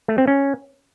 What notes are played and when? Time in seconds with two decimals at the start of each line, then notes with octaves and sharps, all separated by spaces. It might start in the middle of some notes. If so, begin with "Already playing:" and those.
0.08 A3
0.18 C4
0.27 C#4